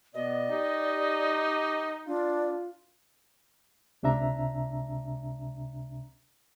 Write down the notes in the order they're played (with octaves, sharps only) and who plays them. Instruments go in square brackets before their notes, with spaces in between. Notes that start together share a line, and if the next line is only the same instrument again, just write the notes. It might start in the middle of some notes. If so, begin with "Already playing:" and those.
[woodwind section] B2 B3 [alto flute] D5 [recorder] D#5
[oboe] D#4 [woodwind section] G4
[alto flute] D4 [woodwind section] F4
[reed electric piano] C#2 C3 D4 E5 A#5